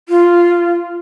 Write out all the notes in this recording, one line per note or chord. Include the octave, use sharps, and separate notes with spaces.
F4